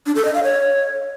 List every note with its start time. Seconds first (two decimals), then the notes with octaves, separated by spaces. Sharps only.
0.06 D4
0.16 A4
0.25 D#5
0.34 F5
0.44 C#5